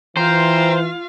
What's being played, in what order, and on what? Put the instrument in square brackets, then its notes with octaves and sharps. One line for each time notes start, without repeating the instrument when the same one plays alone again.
[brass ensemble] E3 [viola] F4 F5 [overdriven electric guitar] C5 [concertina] G5 A#5 C6